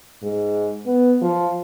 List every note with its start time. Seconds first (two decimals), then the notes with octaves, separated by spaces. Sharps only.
0.22 G#2
0.86 B3
1.22 F3